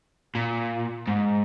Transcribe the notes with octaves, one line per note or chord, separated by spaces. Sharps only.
A#2
G#2